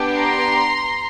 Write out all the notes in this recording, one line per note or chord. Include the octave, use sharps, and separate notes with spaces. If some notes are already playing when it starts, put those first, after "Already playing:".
Already playing: B3 D4 G4
A#5 C6